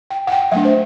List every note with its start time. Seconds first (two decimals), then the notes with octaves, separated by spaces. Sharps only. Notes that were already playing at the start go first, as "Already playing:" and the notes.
0.10 G5
0.27 F#5
0.32 G5
0.52 F#3 A3 D4 E5
0.65 C5